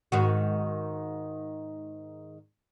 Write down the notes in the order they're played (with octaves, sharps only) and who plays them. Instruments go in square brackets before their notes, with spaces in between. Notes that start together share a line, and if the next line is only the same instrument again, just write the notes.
[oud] G#2 D#3 F#4